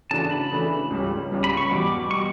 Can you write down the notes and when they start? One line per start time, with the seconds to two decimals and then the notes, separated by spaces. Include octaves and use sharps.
0.11 C#3 E3 A3 D4 F#4 A5
0.31 B5
0.51 C#3 E3 A3 D4 F#4
0.91 C#2 C#3 G3 C#4
1.31 C#2 C#3 G3 C#4
1.44 B5
1.57 C#6
1.71 E2 B2 G3 D6
2.11 B2 G3 C#6